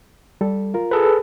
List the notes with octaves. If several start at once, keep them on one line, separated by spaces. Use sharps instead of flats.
G3 A4
F4 A#4
G#4 A4 B4